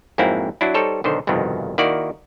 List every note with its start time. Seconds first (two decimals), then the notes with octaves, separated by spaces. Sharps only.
0.18 F2 G#2 F#3 A#3 C4 E4
0.61 F#3 D4 E4
0.74 G3 D#4 A4 C5 C#5
1.04 B1 D3 D#3 C5
1.27 G1 C2 F2 B2 D#3
1.78 D#3 A#3 E4 F#4 D5